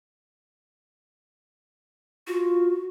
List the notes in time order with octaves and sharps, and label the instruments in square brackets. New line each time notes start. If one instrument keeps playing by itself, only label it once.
[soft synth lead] F4 [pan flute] F#4